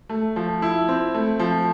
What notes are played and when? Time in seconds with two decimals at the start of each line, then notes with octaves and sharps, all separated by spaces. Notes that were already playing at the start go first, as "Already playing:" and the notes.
0.09 A3
0.36 F3
0.62 E4
0.89 C4
1.14 A3
1.39 F3